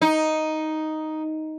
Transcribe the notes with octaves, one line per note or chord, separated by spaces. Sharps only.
D#4